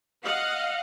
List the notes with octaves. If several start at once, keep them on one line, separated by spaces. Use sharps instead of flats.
D#5 F5 F#5